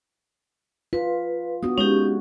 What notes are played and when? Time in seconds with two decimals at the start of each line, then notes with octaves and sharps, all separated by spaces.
0.93 F4 B4
1.63 B3 D4 F#4 D#6
1.78 G#3 C#4 D#4 G4 C#5